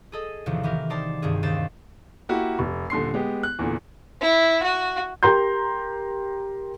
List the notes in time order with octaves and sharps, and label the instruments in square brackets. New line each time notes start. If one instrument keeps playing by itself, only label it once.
[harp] G#4 A4 D#5
A1 E2 C3 D#3 F3
D#3 E3 G4 A#4
D#4 C5 D5 A5
C2 G2 D#3 G#4
D#2 D#3 C5 A6 E7
[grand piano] A#3 E4 F#4 G4
F1
D#1 D3 C6 C7
G#3 B3 G4
F#6
E2 A#2 D3
[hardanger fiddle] E4
F#4
[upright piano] G4 A#4 A#5 C6 G6